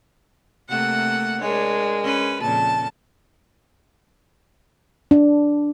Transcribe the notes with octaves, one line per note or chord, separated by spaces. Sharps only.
C3 A3 A#3 F#5
G#3 D4 A#4 C#5
C#4 B4
F2 A#2 C#3 A5
D4